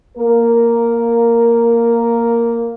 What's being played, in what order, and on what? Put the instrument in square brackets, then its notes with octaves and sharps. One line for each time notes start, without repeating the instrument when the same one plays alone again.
[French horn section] A#3 A#4